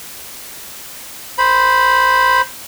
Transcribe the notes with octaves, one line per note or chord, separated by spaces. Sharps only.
C5 B5